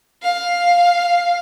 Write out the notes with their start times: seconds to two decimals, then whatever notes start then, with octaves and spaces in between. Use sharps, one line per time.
0.22 F5